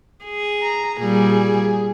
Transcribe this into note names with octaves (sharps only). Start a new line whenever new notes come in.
G#4
A#5
A#2 G3 G#4